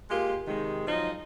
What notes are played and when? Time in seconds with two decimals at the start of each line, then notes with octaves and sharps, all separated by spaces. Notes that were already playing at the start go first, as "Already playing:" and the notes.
0.10 G#3 A#3 F4 G4
0.47 C3 D#3 G#3
0.87 F3 F#3 G#3 D#4